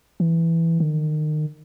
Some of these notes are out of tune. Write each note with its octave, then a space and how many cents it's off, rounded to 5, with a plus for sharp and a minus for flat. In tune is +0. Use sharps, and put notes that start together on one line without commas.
E3 +5
D#3 -30